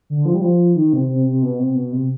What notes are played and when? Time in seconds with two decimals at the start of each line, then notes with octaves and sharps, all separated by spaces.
0.10 D3
0.25 F3
0.34 G3
0.41 F3
0.76 D#3
0.93 C3
1.09 C3
1.26 C3
1.43 B2
1.59 C3
1.75 B2
1.92 C3